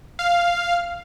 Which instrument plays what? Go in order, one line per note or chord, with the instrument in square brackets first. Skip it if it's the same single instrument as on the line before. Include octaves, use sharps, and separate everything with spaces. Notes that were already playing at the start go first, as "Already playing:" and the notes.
[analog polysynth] F5